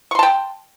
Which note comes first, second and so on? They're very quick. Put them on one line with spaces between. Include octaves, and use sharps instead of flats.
C#6 C6 A5 G5